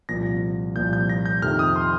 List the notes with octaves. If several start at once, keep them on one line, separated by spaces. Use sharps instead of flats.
C2 A#2 F3 A#6
C2 A#2 F3 G6
G6
A#6
G6
F2 C3 D#3 F6
D#6
C6